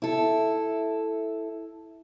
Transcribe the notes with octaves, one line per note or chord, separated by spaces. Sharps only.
E4 A4